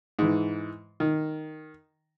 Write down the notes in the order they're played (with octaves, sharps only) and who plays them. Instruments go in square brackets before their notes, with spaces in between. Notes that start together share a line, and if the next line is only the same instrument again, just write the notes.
[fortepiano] G#2 E3
D#3